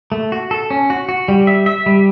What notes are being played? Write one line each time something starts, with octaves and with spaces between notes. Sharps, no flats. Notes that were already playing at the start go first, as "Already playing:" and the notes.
A3
F#4
A4
C#4
F#4
F#4
G3
E5
E5
G3